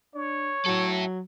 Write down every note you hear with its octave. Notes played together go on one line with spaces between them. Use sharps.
D4 C#5
F#3 E4 A4